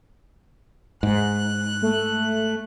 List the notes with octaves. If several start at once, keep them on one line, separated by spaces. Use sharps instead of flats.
G#2 F#6
A3